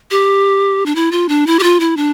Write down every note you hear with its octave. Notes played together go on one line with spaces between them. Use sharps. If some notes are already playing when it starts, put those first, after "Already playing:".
G4
D4
E4
F4
D4
E4
G4
F4
E4
D4